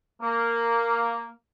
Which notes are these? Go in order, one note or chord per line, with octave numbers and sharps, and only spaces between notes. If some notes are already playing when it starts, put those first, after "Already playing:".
A#3